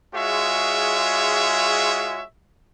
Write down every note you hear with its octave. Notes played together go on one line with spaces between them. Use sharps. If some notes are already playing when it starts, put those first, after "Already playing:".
G#3 F4 F#4 G#4 C#5 E5